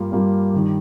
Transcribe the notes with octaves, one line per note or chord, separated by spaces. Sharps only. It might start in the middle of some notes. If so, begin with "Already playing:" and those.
Already playing: G2 G3 A#3 F4
G2 G3 A#3 F4
G2 D#3 G3